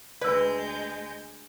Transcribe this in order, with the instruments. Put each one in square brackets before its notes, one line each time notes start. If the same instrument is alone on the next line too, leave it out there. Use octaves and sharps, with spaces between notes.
[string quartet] D2 G#3 G6 [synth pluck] B4 [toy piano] D5 E6